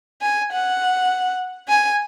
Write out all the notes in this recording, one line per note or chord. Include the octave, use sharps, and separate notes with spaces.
G#5
F#5
G#5